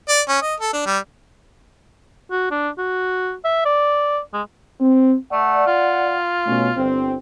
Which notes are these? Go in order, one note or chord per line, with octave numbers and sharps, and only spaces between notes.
D5
C#4
D#5
A4
D4
G3
F#4
D4
F#4
E5
D5
G#3
C4
A3 D5 F#5
F4
B2 A3 C#4
G1 C4